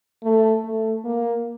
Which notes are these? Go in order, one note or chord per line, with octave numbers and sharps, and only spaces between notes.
A3
A3
A#3